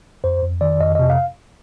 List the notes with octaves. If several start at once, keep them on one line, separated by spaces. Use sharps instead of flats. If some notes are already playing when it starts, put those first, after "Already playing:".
F2 C5
F2
D#3 D5
F2 D#5
C3 D#5
F5